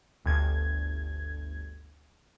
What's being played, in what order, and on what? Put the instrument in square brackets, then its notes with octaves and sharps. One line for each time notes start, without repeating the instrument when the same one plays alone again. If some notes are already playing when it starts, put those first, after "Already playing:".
[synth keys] G1 D2 G#6